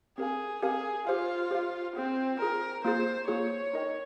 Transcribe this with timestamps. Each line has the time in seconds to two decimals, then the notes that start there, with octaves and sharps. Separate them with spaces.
0.18 C4 G4 G#4 A#4 F5 G#5
0.63 C4 G4 G#4 A#4 F5 G#5
1.07 F4 G4 C5 F5
1.51 G4 C5 F5
1.95 C4 F4 G#4 C5
2.40 F4 G#4 A#4 C5
2.84 A#3 F4 G#4 C5
3.28 A#3 F4 G#4 C#5
3.73 D#4 A#4 D#5 G5